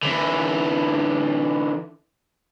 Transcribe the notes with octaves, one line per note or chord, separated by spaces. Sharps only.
D3 E3